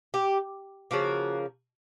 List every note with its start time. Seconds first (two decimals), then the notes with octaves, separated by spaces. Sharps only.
0.14 G4
0.91 C#3 F3 A#3 F#4